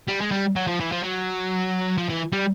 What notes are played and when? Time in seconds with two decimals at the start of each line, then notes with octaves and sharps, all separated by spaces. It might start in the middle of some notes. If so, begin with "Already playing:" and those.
0.08 G3
0.21 G#3
0.32 G3
0.56 F#3
0.67 F3
0.80 E3
0.92 F3
1.03 F#3
1.98 F3
2.09 E3
2.32 G3